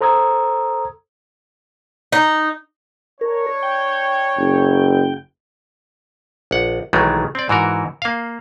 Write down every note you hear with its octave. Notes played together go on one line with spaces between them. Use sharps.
A4 C5 A#5 D#6 E6 G#6
D#4
D4 A#4 C#5
G5
F#1
A#1 F#5
B1 D#3 E3 F#3 G#3 A3
C4 D5
G#2 E3 F#4 A#4
A#3 F5